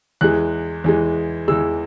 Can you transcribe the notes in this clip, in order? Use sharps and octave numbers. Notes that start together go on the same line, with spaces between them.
E2 E3 G#3 F#6
E2 E3 G#3
E2 E3 G#3 E6